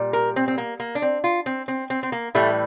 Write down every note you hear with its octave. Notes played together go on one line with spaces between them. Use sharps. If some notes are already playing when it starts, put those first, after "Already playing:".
Already playing: A#2 G3
A#4
C4
C4
A#3
A#3
D4
C4
F4
C4
C4
C4
C4
A#3
A2 E3 G3 A3